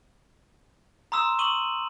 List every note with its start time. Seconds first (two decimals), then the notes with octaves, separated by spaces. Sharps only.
1.12 A#5 C6 D#6 E6 E7
1.39 C#6 D#6 D#7 F#7